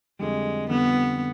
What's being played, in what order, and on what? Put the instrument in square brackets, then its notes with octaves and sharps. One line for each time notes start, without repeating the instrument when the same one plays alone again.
[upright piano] F2 D3 G3 [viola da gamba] G#3
[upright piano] F2 D3 G3 [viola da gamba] B3